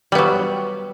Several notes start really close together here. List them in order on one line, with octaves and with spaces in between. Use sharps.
G3 B3 F#3